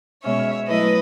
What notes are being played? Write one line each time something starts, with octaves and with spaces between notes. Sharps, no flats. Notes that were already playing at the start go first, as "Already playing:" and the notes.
B2 G#3 C#4 C#5 E5
F#3 A3 E4 B4 D#5